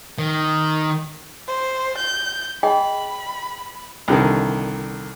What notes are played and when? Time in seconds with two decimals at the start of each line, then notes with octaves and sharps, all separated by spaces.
0.19 D#3
1.48 C5
1.98 G6
2.63 G#4 D#5 G5 B5
4.08 C2 D3 D#3